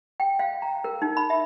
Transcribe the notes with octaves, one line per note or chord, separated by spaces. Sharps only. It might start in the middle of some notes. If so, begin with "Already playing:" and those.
G5
F5
A#5
A#4
D#4
B5
E5